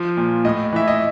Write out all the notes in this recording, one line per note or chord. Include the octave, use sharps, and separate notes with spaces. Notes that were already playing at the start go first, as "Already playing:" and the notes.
Already playing: F3
A#2
A2 D#5
E3 E5
D#5